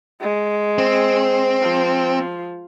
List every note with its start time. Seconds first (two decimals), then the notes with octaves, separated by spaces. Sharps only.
0.21 G#3
0.78 C4
1.62 F3